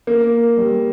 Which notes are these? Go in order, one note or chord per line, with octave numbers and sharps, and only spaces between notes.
A#3
G3